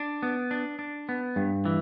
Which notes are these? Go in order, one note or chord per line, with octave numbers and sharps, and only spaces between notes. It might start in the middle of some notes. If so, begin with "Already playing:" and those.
Already playing: D4
B3
D4
D4
B3
G2
E3